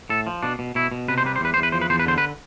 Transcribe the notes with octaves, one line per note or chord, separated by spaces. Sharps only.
A2 A4
F3
B2 D4
B2
B2 E4
B2
C3 B4
C5
G3 B4
C5
E2 B4
E2 C5
B4
F3 C5
B4
E2 C5
B4
D3 C5
B4